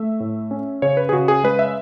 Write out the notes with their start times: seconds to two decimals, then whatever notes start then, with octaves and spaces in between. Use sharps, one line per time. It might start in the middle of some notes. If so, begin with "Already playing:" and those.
Already playing: A3 E5
0.20 A2
0.51 C#4
0.82 C#3 C#5
0.97 B4
1.09 G#4
1.12 C#3 F#4
1.28 G#4
1.44 G#3 B4
1.59 E5